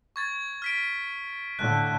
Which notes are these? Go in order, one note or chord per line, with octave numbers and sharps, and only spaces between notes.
C#6 G#6 A6
F6 B6 D7
A2 D3 F#6